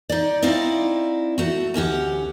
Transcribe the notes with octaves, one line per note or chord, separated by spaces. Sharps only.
D#4 D5
C4 D#4 E4 D5 F5
A3 F#4
D2 C#4 G4 F#5